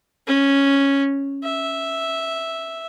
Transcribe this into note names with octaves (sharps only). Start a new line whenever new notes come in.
C#4
E5